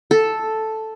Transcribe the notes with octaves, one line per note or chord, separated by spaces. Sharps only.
A4